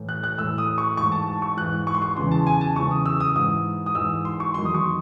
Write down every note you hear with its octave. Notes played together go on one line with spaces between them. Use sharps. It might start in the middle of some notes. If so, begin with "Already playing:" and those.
Already playing: A2 E3
F#6
F#6
A2 E3 E6
D#6
C#6
G#2 E3 C#6
A5
A5
C#6
G#2 E3 F#6
C#6
C6
C#6
E2 C#3 E3 C6
A5
G#5
A5
E2 C#3 E3 C#6
D#6
E6
D#6
G#2 E3 D#6
D#6
G#2 E3 E6
C6
C#6
E2 D#3 F#3 C6
D#6
C#6